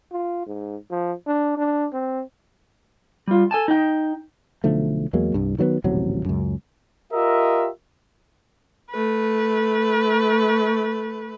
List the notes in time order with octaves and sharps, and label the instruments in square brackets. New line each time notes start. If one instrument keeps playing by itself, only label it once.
[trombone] F4
G#2
F3
D4
D4
C4
[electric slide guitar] G3 F4
A4 G#5 A5
D#4 G5
[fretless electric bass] B1 D3 F3 A3
E2 F#3 G#3 A#3
C2 G2
D#3 F#3 A#3 B3
D#1 A1 C3 F#3
C#2 F#2
[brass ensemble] F4 G4 A#4 D#5 E5
[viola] A3 B4